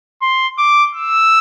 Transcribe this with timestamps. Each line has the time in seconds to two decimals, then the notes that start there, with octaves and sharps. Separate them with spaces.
0.22 C6
0.58 D6
0.95 E6